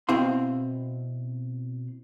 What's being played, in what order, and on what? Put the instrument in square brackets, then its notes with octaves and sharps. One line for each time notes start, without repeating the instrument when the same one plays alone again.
[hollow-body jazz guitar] B2 C4 E4 F5 C6